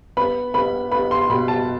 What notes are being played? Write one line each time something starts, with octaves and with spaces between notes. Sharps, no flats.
B3 B5
B3 B5
B3 B5
C6
B2 B5
A5